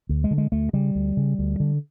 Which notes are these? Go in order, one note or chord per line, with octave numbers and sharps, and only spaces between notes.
D2
G#3
D3
G#3
D2 A3
C#3 G3
D2
C#3
D2
D3